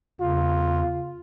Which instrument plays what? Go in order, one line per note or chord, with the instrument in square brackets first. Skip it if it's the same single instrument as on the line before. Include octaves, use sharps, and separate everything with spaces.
[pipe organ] E2 C#3 [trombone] F4